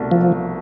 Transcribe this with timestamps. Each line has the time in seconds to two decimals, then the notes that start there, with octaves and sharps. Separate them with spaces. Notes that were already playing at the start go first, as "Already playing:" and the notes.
Already playing: C2 B2 A3 D4
0.11 F3